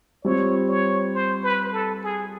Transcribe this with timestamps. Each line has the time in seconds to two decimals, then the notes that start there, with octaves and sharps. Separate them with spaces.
0.24 G3 C4 F4 C#5
0.68 C#5
1.14 C5
1.43 B4
1.73 A4
2.04 G#4